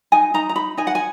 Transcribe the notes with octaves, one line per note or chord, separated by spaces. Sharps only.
D#4 G#5
D#4 A#5
A#5
D#4 B5
D#4 G#5
F#5
G#5